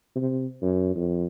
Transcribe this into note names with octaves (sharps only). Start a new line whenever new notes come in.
C3
F#2
F2